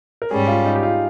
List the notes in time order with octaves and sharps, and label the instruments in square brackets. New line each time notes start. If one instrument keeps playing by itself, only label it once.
[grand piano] A#4
[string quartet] G#2 G3 C#4 [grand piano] G#4
[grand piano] F4
D#4
G4
F4